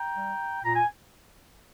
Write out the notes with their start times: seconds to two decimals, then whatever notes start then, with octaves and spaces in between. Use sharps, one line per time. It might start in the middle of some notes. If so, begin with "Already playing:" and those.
Already playing: G5 A#5
0.16 G3
0.64 A#2 A#5
0.75 G#5